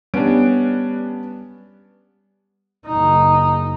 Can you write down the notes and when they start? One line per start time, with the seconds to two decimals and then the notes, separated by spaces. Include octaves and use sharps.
0.14 G3 B3 C#4 D4 D7
2.86 F#1 D#4